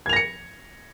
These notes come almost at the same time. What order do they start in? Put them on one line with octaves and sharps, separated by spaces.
G#6 F7 A#6 C#7